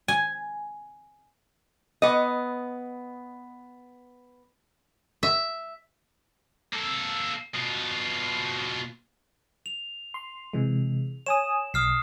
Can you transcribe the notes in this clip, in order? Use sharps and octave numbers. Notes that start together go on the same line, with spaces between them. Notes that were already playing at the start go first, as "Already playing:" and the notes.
G#5
B3 D#5
E5
A#3 A4
B2 F4
F7
C6
C3 E3 G#3
C#5 G#5 D#6 E7
B1 D#6 F6 C7